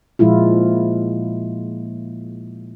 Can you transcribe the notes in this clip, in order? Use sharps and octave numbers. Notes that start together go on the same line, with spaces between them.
A#2 F3 G#3 E4 F4